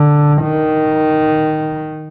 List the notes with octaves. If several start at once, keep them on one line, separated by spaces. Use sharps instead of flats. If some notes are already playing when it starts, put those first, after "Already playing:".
Already playing: D3
D#3